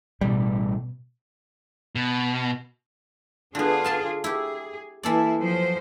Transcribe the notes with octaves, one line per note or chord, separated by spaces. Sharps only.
A1 B2 G3
B2
D3 B3 D4 F4 G#4
F5 A5 C6
E4 G4 G#4
E3 A#3 E4 A4 D5
F3 F#3 C5